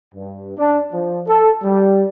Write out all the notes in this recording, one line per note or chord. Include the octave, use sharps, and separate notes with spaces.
G2
D4
F3
A4
G3